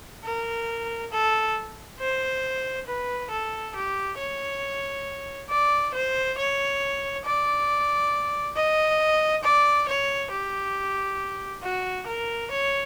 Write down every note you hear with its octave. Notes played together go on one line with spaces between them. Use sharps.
A#4
A4
C5
B4
A4
G4
C#5
D5
C5
C#5
D5
D#5
D5
C#5
G4
F#4
A#4
C#5